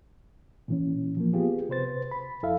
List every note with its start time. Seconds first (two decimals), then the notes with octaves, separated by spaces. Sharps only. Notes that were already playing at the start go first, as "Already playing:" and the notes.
0.68 A#2 E3 C#4
1.17 F3 A#3
1.33 B3 F4 G4 G#4
1.69 C3 B4 C5 A6
2.11 B5
2.43 F2 E4 A4 E5 F5